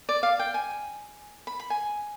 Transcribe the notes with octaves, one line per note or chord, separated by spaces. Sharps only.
D5
F5
G5
G#5
B5
B5
G#5